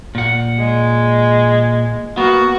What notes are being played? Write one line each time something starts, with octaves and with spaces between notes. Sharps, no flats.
A#2 F#5
G#3
A#3 B3 F#4